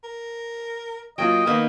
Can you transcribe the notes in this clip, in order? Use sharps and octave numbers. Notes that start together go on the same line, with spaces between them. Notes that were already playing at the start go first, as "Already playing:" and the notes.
A#4
F#3 A#3 F4 D#5 G5
D#3 A#3 B3 D#4